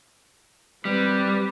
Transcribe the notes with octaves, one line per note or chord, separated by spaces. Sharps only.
G3 C4 B4